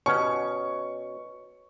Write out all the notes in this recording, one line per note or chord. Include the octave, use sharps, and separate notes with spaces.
B2 C#4 C#6